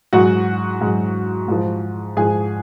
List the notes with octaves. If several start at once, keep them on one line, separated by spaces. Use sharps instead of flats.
G#2 F#3 F#4 F#5
G#2 F#3
G#2 F3
G#2 F3 G#4 G#5